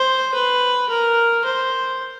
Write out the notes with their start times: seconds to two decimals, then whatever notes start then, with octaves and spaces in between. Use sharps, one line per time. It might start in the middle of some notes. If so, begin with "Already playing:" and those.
Already playing: C5
0.34 B4
0.89 A#4
1.44 C5